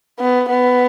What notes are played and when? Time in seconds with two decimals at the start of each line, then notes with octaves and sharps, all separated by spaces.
0.19 B3
0.50 B3